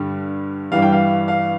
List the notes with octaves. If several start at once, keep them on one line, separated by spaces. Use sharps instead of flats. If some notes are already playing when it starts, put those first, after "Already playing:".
Already playing: G2 D3 G3
G2 E3 G3 F5
G5
F5
F5